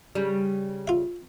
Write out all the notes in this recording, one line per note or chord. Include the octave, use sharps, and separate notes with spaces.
C#3 G3
F4 E5